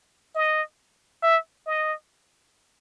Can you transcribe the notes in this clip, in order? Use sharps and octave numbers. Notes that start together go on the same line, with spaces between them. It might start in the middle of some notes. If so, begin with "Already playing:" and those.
D#5
E5
D#5